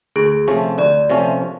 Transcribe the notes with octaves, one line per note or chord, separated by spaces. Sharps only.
D2 G#4
C3 F3 A3 C#4
D2 D5
C3 F3 A3 C#4